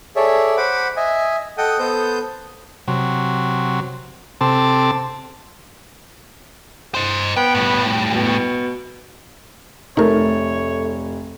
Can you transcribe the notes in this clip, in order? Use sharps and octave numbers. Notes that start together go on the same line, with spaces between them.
G#4 A4 C#5 D5 E5
C5 F#5 B5 D6
D#5 E5 G#5
A4 D#5 F#5 G5 D#6
B3 A4 C5 D#6 G6
C3 F#3
C3 C4 A4 A5 D6
C5 D#5
B3 G5
A2 G3
B2
F1 A3 D#4 A#4 C#5